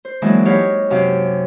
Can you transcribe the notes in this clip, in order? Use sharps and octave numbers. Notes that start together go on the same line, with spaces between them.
C5
E3 F#3 G#3 A#3 D4
D#4 G4 C#5 F5 F#5 B5
F#2 C3 F5 D6